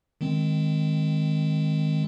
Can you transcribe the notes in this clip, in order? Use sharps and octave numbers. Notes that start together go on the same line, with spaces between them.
D#3 G#3 C4